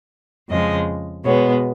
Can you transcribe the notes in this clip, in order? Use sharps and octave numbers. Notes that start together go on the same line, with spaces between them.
F2 C#3 F3 G#3 D#5
B2 G#3 B3 C#5